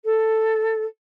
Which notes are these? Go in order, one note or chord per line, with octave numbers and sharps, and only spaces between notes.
A4